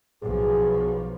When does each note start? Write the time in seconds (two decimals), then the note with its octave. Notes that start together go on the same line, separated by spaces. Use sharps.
0.22 B1 F3 G#4